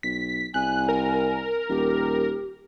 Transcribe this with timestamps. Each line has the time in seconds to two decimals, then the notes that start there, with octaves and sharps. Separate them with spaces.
0.03 B1 B6
0.54 C2 G#5 F#6
0.89 A#4
1.69 D#1 G4